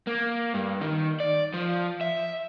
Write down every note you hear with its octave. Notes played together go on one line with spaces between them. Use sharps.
A#3
G2
D#3
D5
F3
E5